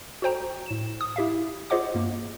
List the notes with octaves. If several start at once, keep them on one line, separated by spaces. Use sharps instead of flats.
F#4 A4 C5 G5 A#5
A2 E7
D#6
E4 G4 E5 F5
F4 G#4 C5 D#5 F#5 D6
G2 A#3